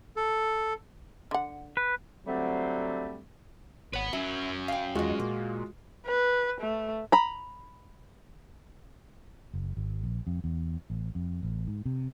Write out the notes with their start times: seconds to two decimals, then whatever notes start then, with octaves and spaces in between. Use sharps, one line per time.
0.16 A4
1.31 D3 F#5
1.77 B4
2.27 D3 F#3 G3 A3 C4
3.93 G#1 B4 C#5 F#5
4.13 F#2 F#3 C#4 E4
4.68 F5 G5
4.95 E2 D#3 G#3 D#4 F4 F#4
5.20 A#2 A#3
6.07 B4
6.61 A3
7.12 A#5 B5
9.54 F#1
9.77 G#1
10.04 A#1
10.27 F2
10.44 E2
10.90 A1
11.15 F2
11.43 A1
11.67 G#2
11.86 C3